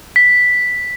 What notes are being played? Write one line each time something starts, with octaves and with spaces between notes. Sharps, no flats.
B6